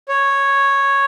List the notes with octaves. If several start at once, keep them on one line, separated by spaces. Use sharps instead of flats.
C#5